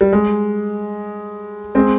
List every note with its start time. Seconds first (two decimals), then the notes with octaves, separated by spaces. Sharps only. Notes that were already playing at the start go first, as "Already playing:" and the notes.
0.01 G3
0.13 G#3
1.75 G#3 C4